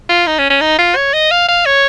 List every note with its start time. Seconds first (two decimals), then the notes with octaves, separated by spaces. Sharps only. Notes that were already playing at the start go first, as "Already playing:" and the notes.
0.09 F4
0.27 D#4
0.38 C#4
0.50 C#4
0.61 D#4
0.79 F4
0.96 C#5
1.14 D#5
1.31 F5
1.48 F5
1.66 C#5